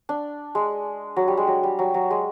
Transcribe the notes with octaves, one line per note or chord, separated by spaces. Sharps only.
D4
G#3
F#3
G3
G#3
F#3
G3
F#3
F#3
G#3